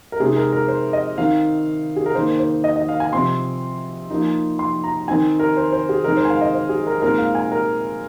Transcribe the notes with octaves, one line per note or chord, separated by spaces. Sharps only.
A#4
C3 G#3 C4 D#4 G#4
A#4
A#4
C5
D#5
D#3 C4 D#4 F5
G#4
A#4
D#3 A#3 D#4 C5
C5
D#5
D#5
F5
G#5
C3 F3 C4 C6
F3 A#3 D#4
C6
A#5
D#3 C4 D#4 G#5
A#4
C5
C5
G#4
D#3 G#3 C4 D#4 A#4
C5
G#5
F5
D#5
C5
G#4
A#4
A#2 G#3 C4 D#4 A#4
F5
G#5
A#4